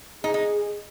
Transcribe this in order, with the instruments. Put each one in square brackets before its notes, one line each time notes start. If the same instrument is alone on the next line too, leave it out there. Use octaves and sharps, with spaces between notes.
[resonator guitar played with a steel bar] D#4 [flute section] G#4
[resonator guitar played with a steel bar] D#4